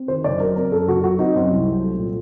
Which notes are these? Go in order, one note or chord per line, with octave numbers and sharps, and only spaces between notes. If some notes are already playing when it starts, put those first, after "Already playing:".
Already playing: C4
D#3 C5
F#1 D5
F#3 A#4
C4 A#4
F#2 A4
F#1 F#4
F#3 F#4
C4 D#4
F#2 C4
C2
F#3
A3
A#2